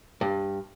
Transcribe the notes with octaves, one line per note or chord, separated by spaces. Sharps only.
G2